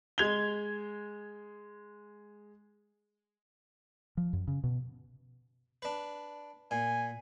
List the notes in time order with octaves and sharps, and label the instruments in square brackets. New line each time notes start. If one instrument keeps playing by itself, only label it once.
[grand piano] G#3 G#6 F7 G7
[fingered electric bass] F3
F#2
C#3
B2
[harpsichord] D4 B4
[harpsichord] A#2 [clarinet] G#5